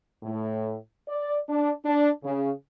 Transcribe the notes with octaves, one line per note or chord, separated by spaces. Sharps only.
A2
D5
D4
D4
C#3